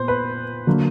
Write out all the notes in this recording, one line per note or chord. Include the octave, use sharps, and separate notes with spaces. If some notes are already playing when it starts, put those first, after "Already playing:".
Already playing: A#2 B3 C5
B4
D3 F#3 A#3